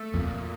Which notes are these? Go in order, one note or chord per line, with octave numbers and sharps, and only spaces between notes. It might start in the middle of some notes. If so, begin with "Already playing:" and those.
Already playing: A3
F2 A#2